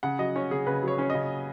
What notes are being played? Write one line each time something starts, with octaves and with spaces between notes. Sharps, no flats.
C#3 F#5
F#3 D#5
C#4 C#5
C#3 G#4
C#3 B4
F#3
C#5
C#4 C#5
C#3 D#5